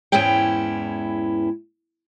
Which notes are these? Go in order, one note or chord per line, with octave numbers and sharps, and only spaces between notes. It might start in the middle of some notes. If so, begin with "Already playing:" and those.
E2 G#2 E3 C#4 E4 G5